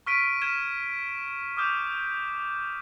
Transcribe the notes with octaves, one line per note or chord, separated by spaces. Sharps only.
C#6 F6 B6 D7 D#7
F6 G#6 B6 D#7 E7
D6 D#6 F6 G6 E7